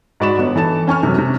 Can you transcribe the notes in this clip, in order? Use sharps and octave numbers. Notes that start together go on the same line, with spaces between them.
G#2 F#4 D5 B5 C#6 E7
G1 B3
E3 A4 A5 E7
C#4 G#5 C#6 F6
F#2 C3
C3